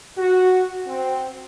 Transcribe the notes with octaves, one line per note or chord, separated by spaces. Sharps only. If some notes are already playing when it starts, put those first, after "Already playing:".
F#4
C4